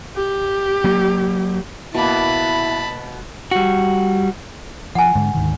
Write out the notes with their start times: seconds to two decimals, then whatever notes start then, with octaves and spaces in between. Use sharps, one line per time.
0.16 G4
0.84 F#3 A#3
1.94 B2 A#3 E4 A5 B5
3.51 G3 F#4
4.95 F3 F#5 G#5
5.15 G#2 D3 G#3
5.34 D2 G#2 D#3